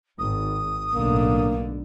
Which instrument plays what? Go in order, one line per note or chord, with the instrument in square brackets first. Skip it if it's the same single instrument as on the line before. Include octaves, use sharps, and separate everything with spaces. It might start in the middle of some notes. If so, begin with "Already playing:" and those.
[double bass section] G#1 [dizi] D#6
[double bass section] B1 A2 [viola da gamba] D3 [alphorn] A#3